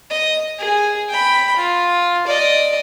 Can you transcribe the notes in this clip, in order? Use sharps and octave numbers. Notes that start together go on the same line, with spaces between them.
D#5
G#4
G5 B5
F4
D5 D#5